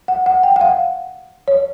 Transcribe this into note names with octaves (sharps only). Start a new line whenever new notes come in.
F#5
F#5
G5
F#5
F5
C#5